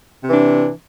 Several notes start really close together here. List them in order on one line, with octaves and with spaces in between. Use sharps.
C3 E3 D4